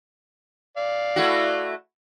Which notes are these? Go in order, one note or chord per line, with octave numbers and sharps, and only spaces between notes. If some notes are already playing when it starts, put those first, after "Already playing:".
D5 F5
A3 E4 F#4